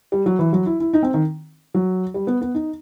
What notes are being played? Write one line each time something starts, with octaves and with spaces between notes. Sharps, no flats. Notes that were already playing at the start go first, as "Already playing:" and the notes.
G3
F#3
E3
F#3
E4
E4
D#4
C4
D#3
F#3
G3
B3
B3
D#4